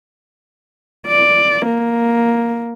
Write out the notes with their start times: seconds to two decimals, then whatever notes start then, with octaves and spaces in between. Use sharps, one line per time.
1.07 D5
1.66 A#3